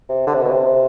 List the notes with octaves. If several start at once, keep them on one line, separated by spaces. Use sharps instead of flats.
C3
D3
C3
B2
C3